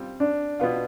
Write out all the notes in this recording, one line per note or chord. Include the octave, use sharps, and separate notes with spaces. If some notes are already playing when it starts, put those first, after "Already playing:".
Already playing: G3 C4 F4
D4
B2 B3 F4